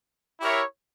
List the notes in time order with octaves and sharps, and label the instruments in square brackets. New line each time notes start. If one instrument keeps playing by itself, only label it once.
[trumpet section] E4 G4 A#4 C#5 E5